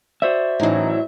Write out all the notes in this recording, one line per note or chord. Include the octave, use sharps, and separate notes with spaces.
F#4 C5 D5 E5
A2 E3 F#3 C#4 D#4